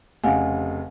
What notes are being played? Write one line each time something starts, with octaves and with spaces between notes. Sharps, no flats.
F1 C#3 F5 F#5 G#5